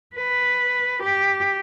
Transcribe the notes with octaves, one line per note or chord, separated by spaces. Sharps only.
B4
G4